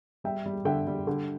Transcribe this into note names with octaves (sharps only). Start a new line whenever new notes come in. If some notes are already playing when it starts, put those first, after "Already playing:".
G3 E5 G5
G3
D3 E5 G5
G3
D3